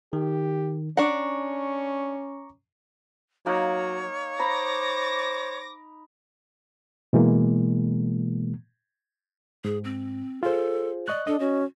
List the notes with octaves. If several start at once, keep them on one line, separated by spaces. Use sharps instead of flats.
D#3 G4
C#4 D4 F#5 A#5 C#6 D6
F#3 A#3 D#4 A#4 C#5
C5 A#5 B5 D6 A#6
B2 E3 G#3 A#3
G#2 G#4
C4
F4 G#4 A4 C5
D5 D#5 C#6 F#6
D4 A4 D#5
C#4 F#4